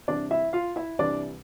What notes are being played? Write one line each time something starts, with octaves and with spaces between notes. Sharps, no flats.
C2 C3 E3 D4 D5
E4 E5
F4 F5
E4 E5
C2 C3 E3 D4 D5